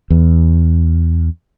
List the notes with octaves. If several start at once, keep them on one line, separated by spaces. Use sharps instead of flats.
E2